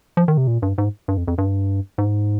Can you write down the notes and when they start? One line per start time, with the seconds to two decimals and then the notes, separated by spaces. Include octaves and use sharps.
0.17 F3
0.28 D#3
0.37 C3
0.47 A#2
0.62 G2
0.78 G#2
1.08 G2
1.17 F2
1.28 F2
1.38 G2
1.98 G#2